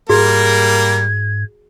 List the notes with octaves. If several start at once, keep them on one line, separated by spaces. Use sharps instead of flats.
G#2 G3 A#3 F#4 G#4 A#4 G#6